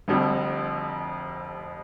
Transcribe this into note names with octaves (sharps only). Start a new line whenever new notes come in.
F1 F2 D3 G3